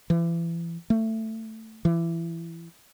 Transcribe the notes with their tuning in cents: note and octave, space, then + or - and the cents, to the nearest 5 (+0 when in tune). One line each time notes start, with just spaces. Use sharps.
E3 +35
A3 +15
E3 +20